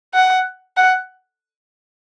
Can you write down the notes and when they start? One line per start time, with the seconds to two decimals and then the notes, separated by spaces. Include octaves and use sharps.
0.14 F#5
0.77 F#5